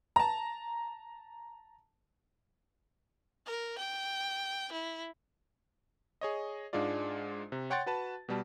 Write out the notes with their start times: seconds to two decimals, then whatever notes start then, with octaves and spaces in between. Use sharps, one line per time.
0.16 A5 A#5
3.46 A#4
3.78 G5
4.72 E4
6.21 G#4 C#5 D#5
6.73 G#2 G#3 D4 F4 D5
7.52 C3
7.70 C#5 F#5 G5 C6 C#6 A6
7.86 F#4 B4 A5
8.29 B2 G3 A5